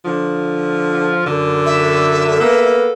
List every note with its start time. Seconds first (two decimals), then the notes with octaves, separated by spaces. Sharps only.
0.04 D3 F3
1.26 F#2 D3
1.66 E5
2.41 A#3 B3 A4